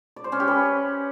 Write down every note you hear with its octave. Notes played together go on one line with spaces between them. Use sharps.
D5
C5
C#4
G4
B4